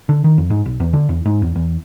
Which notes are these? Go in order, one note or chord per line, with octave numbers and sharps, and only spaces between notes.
D3
D#3
F2
G#2
B1
E2
D3
E2
G#2
E2
E2